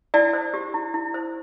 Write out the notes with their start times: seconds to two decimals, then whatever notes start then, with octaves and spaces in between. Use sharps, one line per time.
0.14 E4 D5
0.33 C5
0.54 G4
0.74 E4
0.94 E4
1.14 C5